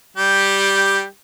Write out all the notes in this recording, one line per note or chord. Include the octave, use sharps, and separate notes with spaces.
G3 G4